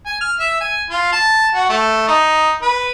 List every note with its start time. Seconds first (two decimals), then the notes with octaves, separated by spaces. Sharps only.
0.06 G#5
0.21 F6
0.39 E5
0.61 G#5
0.90 F4
1.12 A5
1.55 F#4
1.69 A3
2.08 D#4
2.62 B4